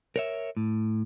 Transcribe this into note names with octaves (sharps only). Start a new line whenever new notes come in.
A#4 C#5 E5
A2